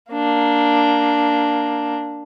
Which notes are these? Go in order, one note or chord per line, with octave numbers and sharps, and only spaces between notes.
A#3 D4